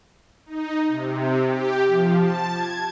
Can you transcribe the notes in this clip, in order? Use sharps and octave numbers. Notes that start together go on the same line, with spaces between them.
D#4
C3
G4
F3
A5
G#6